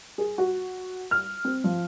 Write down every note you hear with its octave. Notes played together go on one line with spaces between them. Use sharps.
G#4
F#4
F6
C4
F3